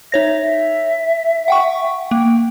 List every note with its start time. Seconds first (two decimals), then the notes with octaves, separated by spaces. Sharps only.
0.12 D#4 C#5 E5 A#6
0.41 E5
1.48 F#5 G5 C#6
2.11 A#3 G5